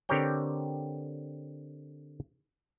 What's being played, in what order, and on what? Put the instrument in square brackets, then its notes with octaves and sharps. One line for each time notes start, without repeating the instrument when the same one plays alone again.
[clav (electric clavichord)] D3 C4 G4 A#4 C#5 G5